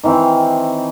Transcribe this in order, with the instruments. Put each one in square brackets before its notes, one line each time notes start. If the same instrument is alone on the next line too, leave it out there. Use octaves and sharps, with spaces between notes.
[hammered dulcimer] D#3 E3 C4